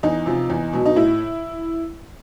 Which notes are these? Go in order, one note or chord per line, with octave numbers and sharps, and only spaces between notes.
E2 D#4
C3 F3
E2
B2 F#3
D#4
A2 E4